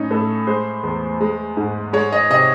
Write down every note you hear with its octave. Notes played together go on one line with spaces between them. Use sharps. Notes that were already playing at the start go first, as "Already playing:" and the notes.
Already playing: A2 C#4 D#4
A2 A4
G#3 C5
E2
G#3
G#2
G#3 C#5
D#5
C3 D#5